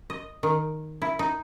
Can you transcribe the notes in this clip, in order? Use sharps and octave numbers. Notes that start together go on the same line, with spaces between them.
D#5
D#3
E4
D#4